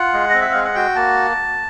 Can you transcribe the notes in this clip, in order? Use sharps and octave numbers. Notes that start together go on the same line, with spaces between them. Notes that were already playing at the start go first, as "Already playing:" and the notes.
Already playing: F4 F#5
G#3
C4 D#5
E5
G#3 F5
F#5
F#4 G5
A#3 A5